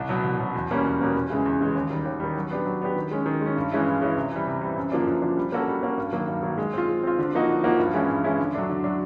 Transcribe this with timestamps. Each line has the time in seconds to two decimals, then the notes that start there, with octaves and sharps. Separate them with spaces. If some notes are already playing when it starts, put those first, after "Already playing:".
Already playing: C2
0.09 B2 F#3
0.24 C2
0.39 B2 F#3
0.55 E2
0.70 B2 G3 A#3 C#4
0.84 E2
1.00 B2 G3 A#3 C#4
1.15 E2
1.30 C#3 E3 G#3
1.46 E2
1.60 C#3 E3 G#3
1.75 D#2
1.90 D#3 G3
2.05 D#2
2.20 D#3 G3
2.36 F#3
2.50 B3 D4 G4
2.66 F#3
2.81 B3 D4 G4
2.96 D#3
3.11 G#3 C#4
3.26 D#3
3.41 G#3 C#4
3.56 G2
3.72 E3 G#3 C#4 E4
3.86 G2
4.01 E3 G#3 C#4 E4
4.16 C3
4.31 E3 G3
4.47 C3
4.61 E3 G3
4.76 F#2
4.92 D3 F3 A#3 D4
5.07 F#2
5.22 D3 F3 A#3 D4
5.37 G3
5.52 A#3 C#4 F#4 A4
5.68 G3
5.83 A#3 C#4 F#4 A4
5.97 G2
6.13 D#3 F#3 A#3
6.28 G2
6.43 D#3 F#3 A#3
6.58 G#3
6.73 C4 F4
6.88 G#3
7.03 C4 F4
7.19 D3
7.34 F3 A#3 D#4 F#4
7.48 D3
7.64 F3 A#3 D#4 F#4
7.78 G2
7.94 E3 G#3 C#4 E4
8.08 G2
8.24 E3 G#3 C#4 E4
8.39 D3
8.55 F#3 A3 D4
8.70 D3
8.84 F#3 A3 D4